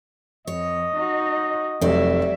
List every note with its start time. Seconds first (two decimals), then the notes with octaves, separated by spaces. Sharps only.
0.47 F2 C#5 D#5
0.96 D#4 F#4
1.81 F1 F#3 G3 D5 E5